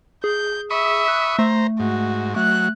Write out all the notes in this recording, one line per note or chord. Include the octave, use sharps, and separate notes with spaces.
G#4 G6
E5 B5 C#6 D#6
F#6
A3 C5 A#5
G#2 F#4
F#3 A3 F#6